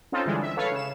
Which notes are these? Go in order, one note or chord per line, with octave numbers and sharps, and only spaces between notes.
C4 C#4 D#4 F4 A4
D3 E3 G3 G#3
E5
A4 B4 C#5 F5
C#3 E7